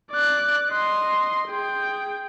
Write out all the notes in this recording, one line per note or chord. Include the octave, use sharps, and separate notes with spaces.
D5 F#6
D#5 C6
G#4 G5